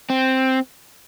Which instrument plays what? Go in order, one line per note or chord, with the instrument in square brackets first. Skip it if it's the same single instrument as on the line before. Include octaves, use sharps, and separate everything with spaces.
[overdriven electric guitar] C4